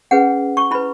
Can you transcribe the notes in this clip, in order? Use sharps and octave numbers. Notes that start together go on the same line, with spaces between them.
C#4 G#4 B4 F#5
C#6
E4 B4 B5